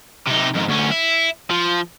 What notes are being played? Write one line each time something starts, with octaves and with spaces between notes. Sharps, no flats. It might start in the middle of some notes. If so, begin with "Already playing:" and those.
C3 D#4
F2 G#2
D2 C#4
E4
F3